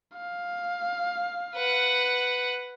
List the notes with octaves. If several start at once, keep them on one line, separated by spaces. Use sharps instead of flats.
F5
B4 F#5